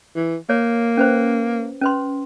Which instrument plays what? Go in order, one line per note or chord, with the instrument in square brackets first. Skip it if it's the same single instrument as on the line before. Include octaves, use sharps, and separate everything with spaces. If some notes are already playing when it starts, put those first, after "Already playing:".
[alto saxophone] E3
[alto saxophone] A#3 [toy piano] C#5
[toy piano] C#4 B4 C5
C#4 B4 C6